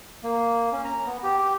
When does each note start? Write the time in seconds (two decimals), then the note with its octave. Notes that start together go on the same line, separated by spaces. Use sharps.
0.23 A#3
0.72 C#4
0.84 A#5
1.06 B3
1.23 G4
1.38 G4